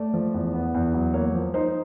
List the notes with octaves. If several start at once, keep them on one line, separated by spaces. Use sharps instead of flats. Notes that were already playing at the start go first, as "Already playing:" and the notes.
Already playing: A3 D5
F3
E2
B3
E2
F#3
A#3 C#5
F3
D#4 C5